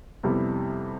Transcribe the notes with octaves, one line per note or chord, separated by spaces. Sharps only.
F2 C3 G3 B3 E4